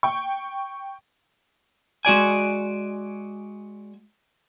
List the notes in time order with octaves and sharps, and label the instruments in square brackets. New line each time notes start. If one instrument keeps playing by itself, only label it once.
[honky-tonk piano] G5 C#6
[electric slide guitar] G#3 F#4 D5 G#5